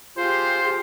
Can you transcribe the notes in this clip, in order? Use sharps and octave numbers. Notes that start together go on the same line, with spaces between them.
F4 G4 G#4 C5 C6